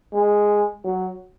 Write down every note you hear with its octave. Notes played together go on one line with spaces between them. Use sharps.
G#3
F#3